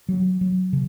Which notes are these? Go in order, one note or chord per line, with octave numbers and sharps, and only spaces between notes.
F#3
F#3
C#3